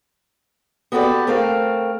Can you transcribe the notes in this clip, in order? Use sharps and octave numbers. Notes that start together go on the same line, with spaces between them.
B3 F#4 G4 A4 B4 D5
A3 C4 A#4 F5